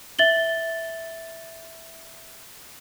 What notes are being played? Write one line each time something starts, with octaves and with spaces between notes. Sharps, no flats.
E5 A6 F#7 G7